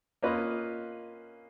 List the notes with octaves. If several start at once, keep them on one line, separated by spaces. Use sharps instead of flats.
A#3 C#4 F4 B4 D#5